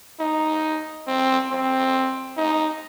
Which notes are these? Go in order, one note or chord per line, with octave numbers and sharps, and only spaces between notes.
D#4
C4
C4
D#4